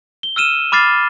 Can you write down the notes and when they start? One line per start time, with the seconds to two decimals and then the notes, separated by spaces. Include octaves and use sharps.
0.23 G7
0.36 E6 F6 D#7 E7
0.72 B5 D6 F6 A6 C7